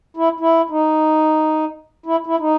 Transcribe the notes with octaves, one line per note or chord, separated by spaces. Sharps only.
E4
E4
D#4
E4
E4
D#4